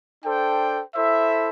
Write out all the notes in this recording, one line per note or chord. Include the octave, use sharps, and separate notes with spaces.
D4 A4 C5 G5
E4 A4 C5 E5